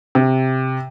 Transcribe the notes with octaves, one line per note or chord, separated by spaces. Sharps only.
C3